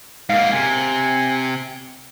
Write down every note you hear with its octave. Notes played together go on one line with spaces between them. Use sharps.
G#2 A#3 F5
C3 G#5